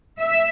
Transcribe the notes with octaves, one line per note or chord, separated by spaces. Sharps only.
E5